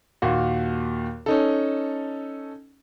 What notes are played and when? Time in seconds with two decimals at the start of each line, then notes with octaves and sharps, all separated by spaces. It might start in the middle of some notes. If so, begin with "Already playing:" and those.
0.22 D#2 A#2 F#4
1.26 C#4 D#4 A4